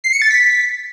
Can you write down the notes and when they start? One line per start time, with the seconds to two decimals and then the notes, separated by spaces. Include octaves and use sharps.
0.04 C7
0.13 C#7
0.22 A6
0.31 B6